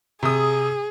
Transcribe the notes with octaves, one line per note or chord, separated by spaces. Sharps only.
C3 G#4 D#6